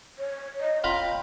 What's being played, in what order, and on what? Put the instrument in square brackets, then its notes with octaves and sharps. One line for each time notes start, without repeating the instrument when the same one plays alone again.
[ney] C#5
D#5
[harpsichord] F4 A#5 B5 [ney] G5